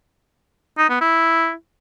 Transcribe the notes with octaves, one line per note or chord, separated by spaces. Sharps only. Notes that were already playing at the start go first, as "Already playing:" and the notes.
D#4
B3
E4